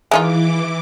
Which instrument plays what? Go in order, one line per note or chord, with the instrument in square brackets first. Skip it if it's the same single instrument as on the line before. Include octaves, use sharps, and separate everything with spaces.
[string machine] E3 D6 [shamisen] G#3 D#4 F4